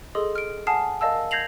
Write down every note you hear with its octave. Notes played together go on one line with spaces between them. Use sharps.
G#4 A4 D#5 C6 D#6
F6 D7
F#5 G#5 A5 D#6 F6 C7
A#4 D5 D#5 F5 A5 E6
G6 G#6 A#6 C7 F7 F#7